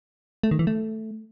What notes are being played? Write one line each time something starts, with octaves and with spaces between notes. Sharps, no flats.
A3
D#3
E3
A3